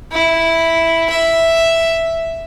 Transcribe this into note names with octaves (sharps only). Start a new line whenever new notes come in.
E4
E5